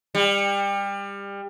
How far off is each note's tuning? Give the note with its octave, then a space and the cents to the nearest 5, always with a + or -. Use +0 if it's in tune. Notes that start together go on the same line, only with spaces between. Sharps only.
G3 +25